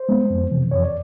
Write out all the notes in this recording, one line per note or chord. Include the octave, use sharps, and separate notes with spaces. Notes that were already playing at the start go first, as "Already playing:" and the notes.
Already playing: C5
G#3 B3
F2
C3 E3
F2 C#5
D5